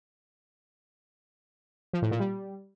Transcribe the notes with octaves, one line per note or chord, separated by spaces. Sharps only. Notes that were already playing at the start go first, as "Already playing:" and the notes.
F3
A2
A#2
G3